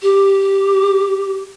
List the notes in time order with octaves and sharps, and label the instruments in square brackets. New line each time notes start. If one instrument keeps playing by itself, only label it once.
[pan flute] G4